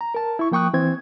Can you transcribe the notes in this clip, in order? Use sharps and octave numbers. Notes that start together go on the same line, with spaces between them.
A#5
A#4 A5
E4 C#6
F3 A#3 G5 C#6 D#6 F#6
E3 C4 G#6